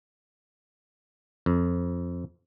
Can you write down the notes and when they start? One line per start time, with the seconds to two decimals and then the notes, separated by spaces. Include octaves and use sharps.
1.46 F2